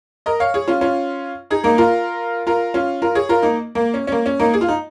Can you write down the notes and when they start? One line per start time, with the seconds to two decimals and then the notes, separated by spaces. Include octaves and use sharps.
0.26 A#4 D#5
0.40 C#5 F5
0.54 G#4 C#5
0.68 C#4 F4
0.81 C#4 F4
1.51 D#4 G#4
1.64 A#3 D#4
1.78 F4 A#4
2.47 F4 A#4
2.74 C#4 F4
3.02 F4 A#4
3.15 G#4 C#5
3.29 F4 A#4
3.42 A#3 D#4
3.75 A#3
3.94 C#4
4.07 C#4
4.12 A#3
4.26 C#4
4.39 A#3 D#4
4.54 G#4
4.61 F4
4.68 D#4